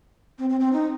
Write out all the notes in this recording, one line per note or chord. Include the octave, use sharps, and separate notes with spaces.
C4
C4
C4
D#4